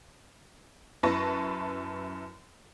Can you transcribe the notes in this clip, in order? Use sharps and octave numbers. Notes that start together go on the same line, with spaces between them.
F#2 E4 B4 A5 C#6 A#6